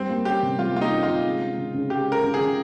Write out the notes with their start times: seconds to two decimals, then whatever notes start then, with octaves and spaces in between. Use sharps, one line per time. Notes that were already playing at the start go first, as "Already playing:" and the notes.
Already playing: G3 C4
0.10 A#3
0.25 C#4 G4
0.43 C3
0.59 G3 F4
0.75 A#3 F4
0.81 D#4
0.92 C#4
1.03 F4
1.08 C3
1.24 G#3
1.41 C#4
1.57 C#3
1.74 C#3
1.90 G#3 G4
2.07 C#4
2.12 A#4
2.23 C#3
2.34 G#4
2.40 C#3